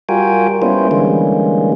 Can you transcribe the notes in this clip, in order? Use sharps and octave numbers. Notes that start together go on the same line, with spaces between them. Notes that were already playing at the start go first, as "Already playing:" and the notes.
G3 F4 F#4 A#4 G5 G#5
G3 A#3 B3 C#4 E4 C5
D3 E3 G3 G#3 A#3 C#4